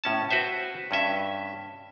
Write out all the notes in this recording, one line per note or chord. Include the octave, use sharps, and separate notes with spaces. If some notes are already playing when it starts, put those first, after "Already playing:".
A2 C#4 A5
F#4 B4 C5 E5
G2 C#4 E5